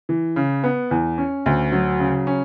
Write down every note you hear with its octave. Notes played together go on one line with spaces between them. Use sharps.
E3
C#3
B3
E2
C#4
D2
F#3
C#3
C#4